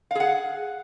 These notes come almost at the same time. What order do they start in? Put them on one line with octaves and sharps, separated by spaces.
F5 G#4 F#5